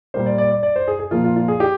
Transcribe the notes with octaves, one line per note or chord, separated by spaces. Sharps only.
A#2 G3 A#3 C5
D5
D5
D5
D5
C5
G#4
G#4
A#2 F3 A#3 F4
F4
F4
G#4
G4